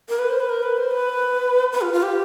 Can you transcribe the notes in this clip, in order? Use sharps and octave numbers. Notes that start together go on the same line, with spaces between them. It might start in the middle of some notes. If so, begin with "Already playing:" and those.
A#4
B4
C5
B4
A#4
B4
C5
B4
B4
F4
F4
G4